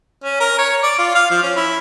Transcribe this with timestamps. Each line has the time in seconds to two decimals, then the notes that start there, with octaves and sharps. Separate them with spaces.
0.23 C#4
0.40 A#4
0.58 C#5
0.83 D5
0.98 F4
1.15 F5
1.30 F3
1.42 C#4
1.57 E4